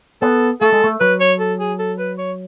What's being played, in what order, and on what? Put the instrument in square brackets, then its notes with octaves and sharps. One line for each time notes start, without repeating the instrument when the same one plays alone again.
[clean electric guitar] B3 [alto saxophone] A4
[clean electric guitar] A3 [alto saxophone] A4
[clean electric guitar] G#3
A3
[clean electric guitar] F#3 [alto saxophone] B4
[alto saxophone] C#5
A4
G#4
A4
B4
C#5